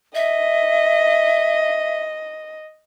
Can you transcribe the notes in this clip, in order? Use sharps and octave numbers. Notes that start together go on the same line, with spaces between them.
D#5 E5